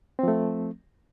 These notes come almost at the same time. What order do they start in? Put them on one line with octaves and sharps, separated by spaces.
C4 F3 A3